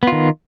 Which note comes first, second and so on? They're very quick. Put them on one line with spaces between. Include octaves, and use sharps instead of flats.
B3 F4 D#3